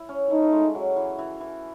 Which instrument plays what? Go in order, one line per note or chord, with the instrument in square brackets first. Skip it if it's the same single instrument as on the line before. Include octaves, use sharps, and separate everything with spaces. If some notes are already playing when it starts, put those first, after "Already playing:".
Already playing: [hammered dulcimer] E4
C#4
[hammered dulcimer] A3 [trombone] D#4
[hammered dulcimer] G#3
F#3
E3
E3
E3